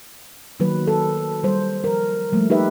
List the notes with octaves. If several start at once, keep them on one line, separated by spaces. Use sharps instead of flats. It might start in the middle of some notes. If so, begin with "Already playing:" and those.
D#3 F#3 A#3 B4
A4
G3 C5
F3 A#4
F3 G3 A3 A#3
D#4 G4 B4 E5